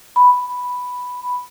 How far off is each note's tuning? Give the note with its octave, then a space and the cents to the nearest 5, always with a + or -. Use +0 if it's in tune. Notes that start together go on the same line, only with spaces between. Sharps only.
B5 +0